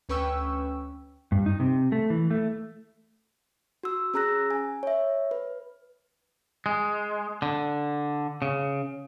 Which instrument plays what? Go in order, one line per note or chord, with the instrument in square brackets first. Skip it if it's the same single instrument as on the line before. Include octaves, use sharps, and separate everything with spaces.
[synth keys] D2 C#4 B4 G5 C#6 E6
[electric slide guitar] G2
D#4
C3
A3
E3
A3
[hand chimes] F#4 E6
C#4 G#4 A#5 E6 F#6 A#6
G#5
C#5 E5
B4
[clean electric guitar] G#3
D3
C#3